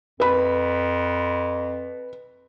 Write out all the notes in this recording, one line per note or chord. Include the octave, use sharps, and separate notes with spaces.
F2 B4 B5